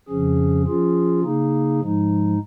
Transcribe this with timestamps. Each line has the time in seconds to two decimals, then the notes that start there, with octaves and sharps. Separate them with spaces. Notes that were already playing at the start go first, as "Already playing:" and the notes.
0.09 F2 C#3 F3 C#4 G#4
0.66 F3 C#4 F4 G#4
1.23 C#3 A#3 D#4 G#4
1.81 G#2 F3 G#3 D#4